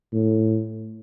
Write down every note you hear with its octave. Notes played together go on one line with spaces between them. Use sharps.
A2